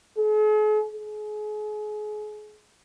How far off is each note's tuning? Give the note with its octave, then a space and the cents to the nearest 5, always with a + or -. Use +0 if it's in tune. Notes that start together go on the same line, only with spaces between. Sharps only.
G#4 +45
G#4 +35